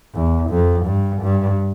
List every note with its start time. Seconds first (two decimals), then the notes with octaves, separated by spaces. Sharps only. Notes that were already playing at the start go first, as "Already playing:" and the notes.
0.14 E2
0.50 F2
0.86 G2
1.22 G2